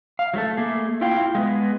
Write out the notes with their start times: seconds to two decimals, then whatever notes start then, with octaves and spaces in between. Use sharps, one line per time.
0.19 F5
0.34 F#3 A3 A4
0.57 A3 A#3 G#4
1.01 E4 F4 F5 G5
1.35 G#3 A#3 B3